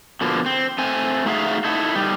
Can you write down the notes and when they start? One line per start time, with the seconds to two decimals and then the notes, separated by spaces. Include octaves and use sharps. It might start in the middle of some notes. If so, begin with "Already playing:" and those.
0.21 B2 D3 F3 A#3
0.46 C4
0.78 A3 C4 G#5
1.26 A3 D#4 F#4 G#4 E5 F5
1.65 D#4 E4 A4
1.95 G3 D#4